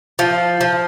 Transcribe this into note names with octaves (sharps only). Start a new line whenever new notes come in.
F3
F3